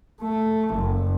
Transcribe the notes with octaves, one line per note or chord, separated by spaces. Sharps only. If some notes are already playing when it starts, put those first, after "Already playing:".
A3
F#1